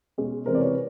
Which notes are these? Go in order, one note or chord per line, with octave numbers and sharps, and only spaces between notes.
B2 G#3 C#4
C3 E3 G#3 C#4 A#4 C5
D5
B4 C#5